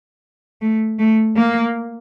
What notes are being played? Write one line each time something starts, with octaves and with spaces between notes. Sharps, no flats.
A3
A3
A#3